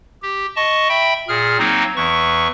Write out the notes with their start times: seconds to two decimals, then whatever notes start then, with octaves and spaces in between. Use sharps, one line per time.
0.22 G4
0.56 D#5 A5 C#6
0.89 E5 G5 B5
1.28 A#2 G#4 F6
1.59 F#3 A#3 C4 D#4
1.96 E2 E3 C#6